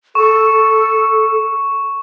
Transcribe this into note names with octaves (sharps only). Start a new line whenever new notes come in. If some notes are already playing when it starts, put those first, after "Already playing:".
A4 C#6